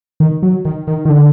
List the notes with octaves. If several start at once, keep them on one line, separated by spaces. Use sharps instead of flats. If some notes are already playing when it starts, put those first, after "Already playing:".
D#3
F#3
D#3
D#3
D#3
D3